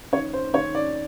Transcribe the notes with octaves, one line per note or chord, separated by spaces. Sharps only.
D#3 C#5
C5
D#3 C#5
D5